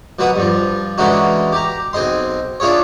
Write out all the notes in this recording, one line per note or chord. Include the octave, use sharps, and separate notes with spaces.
B2 F#3 F#4 B4 F#5 D#6
G2 F3
D3 E3 G#3 C#4 D#4 F#4
G4 A#5
B1 C4 G#4 D#5 C6
D4 E4 F4 G#4 C#5